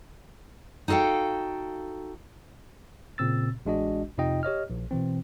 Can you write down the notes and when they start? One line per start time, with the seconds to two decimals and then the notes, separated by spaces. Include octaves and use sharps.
0.88 D#4 F#4 A4 F5 G5
3.18 A#2 C#3 C4 E6 A6
3.66 A1 G#3 D4 F#4 D#5
4.18 F2 C3 D#4 F4 D#5 G5
4.43 G4 C#5 D#5 F6
4.70 A#1
4.91 B2 E3 C4